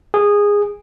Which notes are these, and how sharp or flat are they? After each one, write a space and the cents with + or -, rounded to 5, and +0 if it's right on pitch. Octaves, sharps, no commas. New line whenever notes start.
G#4 -15